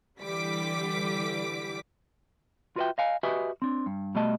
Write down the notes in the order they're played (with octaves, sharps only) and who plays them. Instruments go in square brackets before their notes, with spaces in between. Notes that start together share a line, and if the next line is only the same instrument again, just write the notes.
[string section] D3 E3 G3 D6 B6
[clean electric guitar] F4 F#4 B4 D5 E5 G5
D#5 F5 G#5
F#4 G4 B4 D#5 E5 G#5
C4 D4
G2
B2 G3 A3 D#5 A5